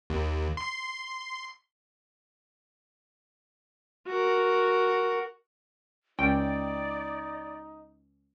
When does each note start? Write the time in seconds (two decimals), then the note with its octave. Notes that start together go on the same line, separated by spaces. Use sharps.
0.10 D#2
0.57 C6
4.07 F#4 A#4
6.19 C#2 D#4 D5 G5